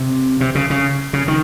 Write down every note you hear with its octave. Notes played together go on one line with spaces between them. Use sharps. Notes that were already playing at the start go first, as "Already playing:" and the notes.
Already playing: C3
C3
C#3
C#3
C#3
D#3